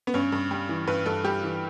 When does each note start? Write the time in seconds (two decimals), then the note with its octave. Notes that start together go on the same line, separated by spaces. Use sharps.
0.07 B3
0.14 G2 C#4
0.32 G2
0.51 G3
0.69 E3
0.87 G2 B4
1.06 G2 A4
1.24 G3 G4
1.43 E3